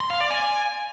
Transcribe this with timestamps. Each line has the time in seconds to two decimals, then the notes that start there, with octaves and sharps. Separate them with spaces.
0.01 C6
0.10 F5
0.20 D5
0.30 G#5